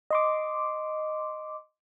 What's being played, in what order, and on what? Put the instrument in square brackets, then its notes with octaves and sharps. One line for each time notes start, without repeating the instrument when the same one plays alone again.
[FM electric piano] D#5 C6 D6